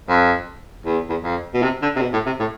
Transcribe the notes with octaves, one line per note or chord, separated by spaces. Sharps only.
F2
E2
E2
F2
B2
C3
D3
C3
B2
A2
C3
A2